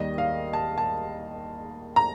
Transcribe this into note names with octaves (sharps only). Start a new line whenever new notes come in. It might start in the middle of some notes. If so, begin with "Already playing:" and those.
Already playing: D#2 D#3 G3 D#5
F5
A5
A5
A#5